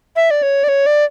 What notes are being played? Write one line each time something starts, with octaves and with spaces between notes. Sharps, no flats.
E5
D5
C#5
D5
C#5
D5